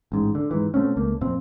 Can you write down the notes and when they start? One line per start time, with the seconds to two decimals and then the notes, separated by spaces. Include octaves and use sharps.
0.12 A1 G#2
0.35 D3
0.51 G#2 E3
0.74 B2 A3 C4 C#4
0.97 C#2 A3 A#3
1.21 F2 A#2 C4